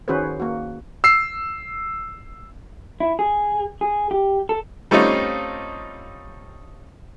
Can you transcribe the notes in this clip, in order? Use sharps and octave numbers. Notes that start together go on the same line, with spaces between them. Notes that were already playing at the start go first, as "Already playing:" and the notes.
D#3 C#4 F#4 G#4 B4 C5
A#3 F#4
E6 C7
E4
G#4
G#4
G4
A4
G3 A3 C4 C#4 D#4 F4